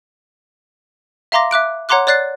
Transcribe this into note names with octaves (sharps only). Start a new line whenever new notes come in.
E5 F5 A#5 C6 D6 A#6
E5 D6 F#6 D7
C#5 F#5 A#5 C6 D6 F#6
C#5 D5 F#6 A6 C7